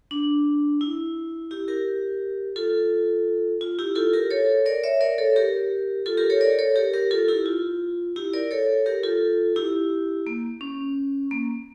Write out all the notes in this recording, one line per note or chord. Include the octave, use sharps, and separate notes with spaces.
D4
E4
E4 G4
G4 A#4
F4 A4
F4
E4 G4
F4 A4
G4 A#4
A4 C#5
A#4 D5
C#5 E5
A#4 D5
A4 C#5
G4 A#4
F4 A4
G4 A#4
A4 C#5
A#4 D5
A4 C#5
G4 A#4
G4 A#4
F4 A4
E4 G4
F4
E4 G4
A#4 D5
A4 C#5
G4 A#4
F4 A4
E4 G4
A#3
C#4
A#3